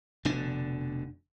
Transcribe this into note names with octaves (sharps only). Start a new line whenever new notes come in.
F1 B2 D3 D4